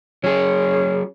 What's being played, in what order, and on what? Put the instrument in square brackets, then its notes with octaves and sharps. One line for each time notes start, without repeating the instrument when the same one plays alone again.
[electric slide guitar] F#3 G#4 [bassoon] C#4